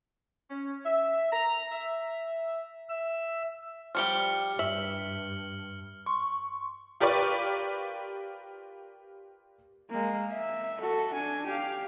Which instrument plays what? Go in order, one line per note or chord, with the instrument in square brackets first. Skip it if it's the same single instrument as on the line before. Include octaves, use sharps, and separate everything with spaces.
[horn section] C#4
E5
A#5
E5
[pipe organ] E5 E6
[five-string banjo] F3 G3 G4 [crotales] F6 C#7 G7
[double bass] G2 [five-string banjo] E5 [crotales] F#7
[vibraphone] C6 [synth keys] C#6
[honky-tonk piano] F4 G4 A#4 B4 D5 C#6
[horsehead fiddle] G#3 A#3
E5
F#4 A4
D4 G#5
G4 F5